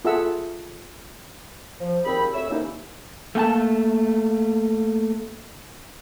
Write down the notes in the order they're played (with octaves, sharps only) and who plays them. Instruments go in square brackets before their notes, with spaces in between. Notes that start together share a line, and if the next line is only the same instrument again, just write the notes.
[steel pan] F4 G#4 A4 E5 F#5 E6
[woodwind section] F3
D#2 A#2 C4 G#4 B5
D2 C#5 E5 E6
C3 D#3 A#3 C#4 D#4 E4
[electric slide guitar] A3 A#3 G5 A5